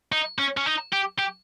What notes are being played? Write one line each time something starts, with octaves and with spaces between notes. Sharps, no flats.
D#4
C#4
C#4
D#4
G4
G4